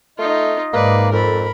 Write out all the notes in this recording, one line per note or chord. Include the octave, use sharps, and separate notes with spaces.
A3 D#4 F4 D#5
G#2 A#3 B4 D5
F2 A4 A#4 B5